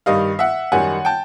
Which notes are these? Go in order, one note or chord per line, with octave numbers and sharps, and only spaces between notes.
G2 D#3 G3 D#5 F5
E5 F#5
F#2 D#3 G3 F#5 G#5
G5 A5